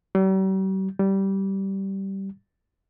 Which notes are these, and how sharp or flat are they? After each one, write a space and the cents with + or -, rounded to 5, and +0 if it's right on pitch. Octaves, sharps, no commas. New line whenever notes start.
G3 -45
G3 -15